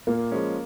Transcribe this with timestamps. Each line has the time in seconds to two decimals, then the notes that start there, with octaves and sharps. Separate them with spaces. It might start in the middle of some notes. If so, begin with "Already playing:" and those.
0.07 A#2 A#3
0.31 F3 G#3 C#4